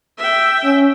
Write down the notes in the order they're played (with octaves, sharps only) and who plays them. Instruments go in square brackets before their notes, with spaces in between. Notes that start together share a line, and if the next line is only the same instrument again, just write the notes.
[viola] E5 G5
[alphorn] C#4